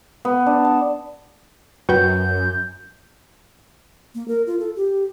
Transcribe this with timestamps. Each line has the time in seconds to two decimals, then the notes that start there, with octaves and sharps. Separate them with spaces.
0.25 B3
0.46 D4
0.65 A5
1.89 F#2 F#4 B4 G5 G6
4.15 A#3
4.28 A#4
4.47 F4
4.59 A4
4.76 G4